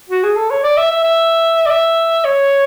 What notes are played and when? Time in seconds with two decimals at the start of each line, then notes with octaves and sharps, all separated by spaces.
0.09 F#4
0.23 G#4
0.36 A4
0.51 C#5
0.63 D5
0.77 E5
0.91 E5
1.04 E5
1.66 D5
1.70 E5
2.25 C#5